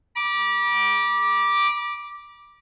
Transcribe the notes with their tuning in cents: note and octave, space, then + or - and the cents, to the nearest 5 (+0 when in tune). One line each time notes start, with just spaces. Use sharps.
B5 -40 D6 +0